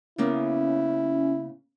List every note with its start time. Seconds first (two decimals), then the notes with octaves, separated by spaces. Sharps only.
0.18 C#3 A#3 B3 C#4 E4